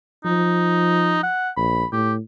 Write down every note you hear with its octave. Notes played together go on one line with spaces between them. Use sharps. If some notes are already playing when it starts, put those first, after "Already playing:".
F3 D#4
F#5
A#1 B5
A2 G4